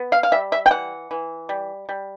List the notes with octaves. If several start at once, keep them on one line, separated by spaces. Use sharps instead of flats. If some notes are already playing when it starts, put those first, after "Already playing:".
Already playing: B3
F5
F5
G3 E5
E5
G5
E3 F#5
E3
G3
G3